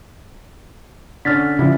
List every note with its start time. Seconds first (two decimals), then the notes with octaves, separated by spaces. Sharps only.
1.25 D3 C#4 F6 A6 B6
1.59 C#3 F3 G3 G#3 E4